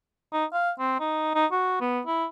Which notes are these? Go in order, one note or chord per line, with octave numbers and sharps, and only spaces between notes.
D#4
F5
C4
D#4
D#4
F#4
B3
E4